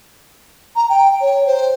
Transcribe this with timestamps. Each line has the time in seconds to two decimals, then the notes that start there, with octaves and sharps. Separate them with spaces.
0.75 A#5
0.89 G5
1.21 C#5
1.46 C5